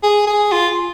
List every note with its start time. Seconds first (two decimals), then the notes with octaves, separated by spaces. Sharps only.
0.03 G#4
0.27 G#4
0.52 F4